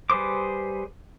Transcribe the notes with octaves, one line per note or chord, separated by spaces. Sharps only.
G3 G#4 B4 C5 D6